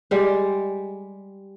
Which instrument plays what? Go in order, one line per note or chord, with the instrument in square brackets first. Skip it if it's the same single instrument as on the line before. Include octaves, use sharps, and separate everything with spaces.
[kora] G3 G#3